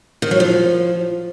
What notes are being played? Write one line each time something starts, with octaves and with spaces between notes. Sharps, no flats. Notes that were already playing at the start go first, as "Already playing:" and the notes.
D#3
F#3
F3